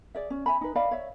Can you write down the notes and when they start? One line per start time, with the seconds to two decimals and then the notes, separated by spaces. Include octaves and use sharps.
0.15 G#4 D5 E5
0.30 C#4
0.46 E5 G#5 B5
0.61 D#4 B4
0.76 D5 D#5 F5 B5
0.91 C#5 E5